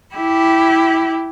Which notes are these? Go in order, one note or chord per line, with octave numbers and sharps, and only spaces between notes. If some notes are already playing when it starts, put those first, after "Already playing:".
E4 G4